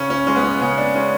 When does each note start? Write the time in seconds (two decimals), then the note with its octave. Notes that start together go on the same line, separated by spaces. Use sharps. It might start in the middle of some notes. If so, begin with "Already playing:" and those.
Already playing: C#3 C#4
0.10 C#4
0.27 G#3 C#4
0.36 B3
0.43 C#4
0.61 C#3 B3
0.78 D4
0.94 G#3 C#4